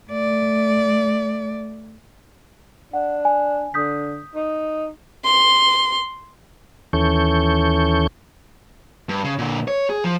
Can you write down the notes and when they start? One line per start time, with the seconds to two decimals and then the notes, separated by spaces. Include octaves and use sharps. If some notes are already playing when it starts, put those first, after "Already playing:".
0.10 A3 D5
2.93 D4 F#5
3.25 G#5
3.74 D3 D#6 G6 B6
4.35 D#4
5.25 C6
6.93 D#2 E3 C#4 A4 C#6 G6
9.09 G2
9.24 C#3
9.38 A#2 D3
9.68 C#5
9.90 G#4
10.04 F3